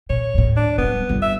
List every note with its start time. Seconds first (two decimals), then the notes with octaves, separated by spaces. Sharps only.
0.10 A#2 C#5
0.34 D#2 A2
0.57 D4
0.78 D1 G3 B3
1.09 G1 A#3
1.22 E5